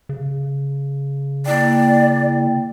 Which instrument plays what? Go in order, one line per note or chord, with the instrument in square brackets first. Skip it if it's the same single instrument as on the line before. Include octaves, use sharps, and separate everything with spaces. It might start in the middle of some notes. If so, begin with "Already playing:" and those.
[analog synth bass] C#3
[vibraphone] A#3 E4 G5 [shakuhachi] D5